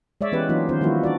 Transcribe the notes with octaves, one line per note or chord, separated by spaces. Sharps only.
G#3 C#5 D5 E5
E3 B3 C#4 G4 B4
E3 F#3 A#3 C#4 D#4 F4
D#3 B3 C#4 F4 C5
D#3 F3 G3 A#3 E4 F#4
D4 F#4 D5